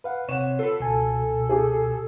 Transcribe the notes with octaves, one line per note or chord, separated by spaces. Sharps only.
B4 F5 F#5
C3 C#5 F#5 E7
F4 A4 B4
C#2 B2 G#5 A5
G4 G#4